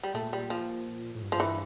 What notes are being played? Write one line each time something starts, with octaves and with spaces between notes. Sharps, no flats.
G3
A#2 A3
G3
F3
A2
G2
F3
E3